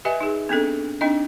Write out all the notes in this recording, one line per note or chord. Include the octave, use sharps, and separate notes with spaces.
G4 B4 D#5 E5 G#5
D#4 G#4
B3 C4 D4 A4
C4 D4 D#4 D#5